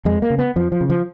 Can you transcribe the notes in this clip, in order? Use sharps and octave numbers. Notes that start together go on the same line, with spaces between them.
F2 G#3
A#3
C#3
B3
F2 F3
F3
C#3
F3